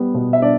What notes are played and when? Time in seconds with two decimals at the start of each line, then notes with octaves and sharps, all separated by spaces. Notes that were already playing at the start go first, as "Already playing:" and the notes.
Already playing: G3 B3
0.15 B2
0.33 E5
0.42 D4 D5